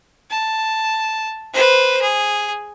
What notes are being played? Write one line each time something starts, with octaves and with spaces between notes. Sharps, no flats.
A5
B4 C5
G#4